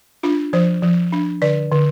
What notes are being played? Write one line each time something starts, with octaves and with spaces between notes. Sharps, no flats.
D4 F4
F3 C5
F3
D4
D3 D5
D3